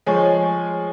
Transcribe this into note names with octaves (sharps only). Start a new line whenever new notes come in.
F3 G#3 C#5 G#5 C#6